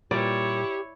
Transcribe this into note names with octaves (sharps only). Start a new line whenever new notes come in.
A#2 G3 E4 G4 C#5 D5